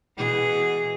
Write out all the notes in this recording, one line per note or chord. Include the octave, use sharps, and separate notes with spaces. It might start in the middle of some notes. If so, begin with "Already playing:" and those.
B2 E3 G#4